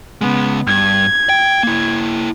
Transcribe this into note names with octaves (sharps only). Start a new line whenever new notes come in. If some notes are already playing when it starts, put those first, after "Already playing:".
C#3 G#3 B3
G2 G#6
G5
A#3 E4